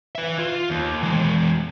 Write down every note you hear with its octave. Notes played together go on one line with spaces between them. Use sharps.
B4 E5
F4
D#2
E3 G#3